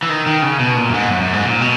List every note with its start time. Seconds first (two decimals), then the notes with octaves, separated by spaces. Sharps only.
0.03 E3
0.09 D#3
0.26 D#3
0.42 C#3
0.59 B2
0.77 A#2
0.89 F#2
0.94 G#2
1.11 F#2
1.21 F#2
1.33 G#2
1.44 A#2
1.61 B2